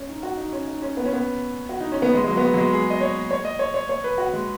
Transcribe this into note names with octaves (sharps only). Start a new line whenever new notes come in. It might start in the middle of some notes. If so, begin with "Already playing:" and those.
Already playing: C#4
D#4
F#4
D#4
C#4
D#4
C#4
B3
C#4
B3
F#4
D#4
C#4
B3
G#3
G#3
F#3
B3
G#3
F#3
G#3
G#4
D#5
C#5
C#5
D#5
C#5
C#5
C#5
B4
F#4
G#3